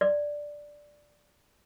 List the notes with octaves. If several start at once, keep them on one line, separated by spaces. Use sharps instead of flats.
D5